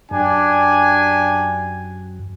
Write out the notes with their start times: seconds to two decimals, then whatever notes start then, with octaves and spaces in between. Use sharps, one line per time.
0.11 F#2 D4 G4 G#5